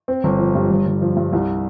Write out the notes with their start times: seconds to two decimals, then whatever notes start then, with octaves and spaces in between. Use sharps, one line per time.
0.08 C4
0.24 G1
0.39 F3
0.55 G2
0.71 G1
0.86 G1
1.02 F3
1.17 G2
1.33 C2